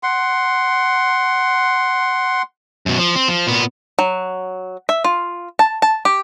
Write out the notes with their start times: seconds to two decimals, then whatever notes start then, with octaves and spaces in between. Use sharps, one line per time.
0.03 F#5 C6
2.86 F#2 B2
2.99 F3
3.16 C4
3.28 F3
3.47 A#2 B3
3.99 F#3
4.89 E5
5.04 F4
5.59 A5
5.82 A5
6.05 G4